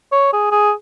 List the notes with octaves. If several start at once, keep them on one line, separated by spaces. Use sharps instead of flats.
C#5
G#4
G#4